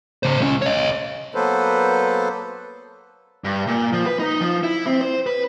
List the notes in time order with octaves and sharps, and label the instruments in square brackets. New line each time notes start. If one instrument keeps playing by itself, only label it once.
[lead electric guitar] C#3 C5
C#2 C#4
C#5 D#5
[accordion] F#3 A#3 B3 A4 B4 C5
[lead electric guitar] G2
A#2
F3
B4
D#4
F3
E4
C4
C5
B4